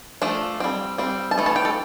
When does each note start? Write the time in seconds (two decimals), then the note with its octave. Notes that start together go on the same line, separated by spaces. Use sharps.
0.22 F3 A3 D4
0.60 G3 C4
0.98 G3 C4
1.31 A5
1.38 E3 A3
1.46 A5
1.56 G5
1.65 A4